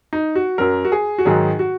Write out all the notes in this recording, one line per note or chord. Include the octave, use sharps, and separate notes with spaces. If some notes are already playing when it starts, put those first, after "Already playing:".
D#4
F#4
F#2 F#3 A#4
F#4
G#4
F#4
G#2 D#3 F#3 G#4
F#4